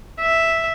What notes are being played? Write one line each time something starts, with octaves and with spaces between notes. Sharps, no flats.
E5